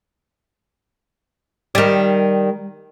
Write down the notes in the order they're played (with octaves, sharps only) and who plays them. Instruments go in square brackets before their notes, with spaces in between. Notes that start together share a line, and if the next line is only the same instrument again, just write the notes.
[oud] D#3 G3